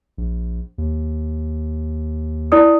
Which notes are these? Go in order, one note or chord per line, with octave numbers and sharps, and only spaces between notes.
A#1
D#2
E4 D5 D#6